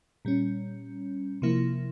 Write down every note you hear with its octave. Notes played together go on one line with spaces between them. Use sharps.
A#2 G3 C#4
C3 F3 A#3 E4